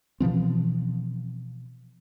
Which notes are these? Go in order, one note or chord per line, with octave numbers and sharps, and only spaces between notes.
B2 E3 F3 C4